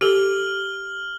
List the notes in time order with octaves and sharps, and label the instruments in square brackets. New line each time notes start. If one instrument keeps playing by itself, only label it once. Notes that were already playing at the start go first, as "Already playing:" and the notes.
[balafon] G4 A4 [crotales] F6 F#7 G7